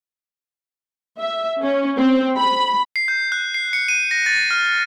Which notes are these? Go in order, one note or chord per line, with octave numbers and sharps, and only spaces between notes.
E5
C#4
C4
B5
C7
G6
F#6
C7
C#7
D#7
A#6
A6
F6